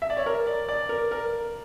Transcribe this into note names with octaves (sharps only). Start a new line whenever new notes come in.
E5
D5
C#5
A#4
D5
D5
A#4
A#4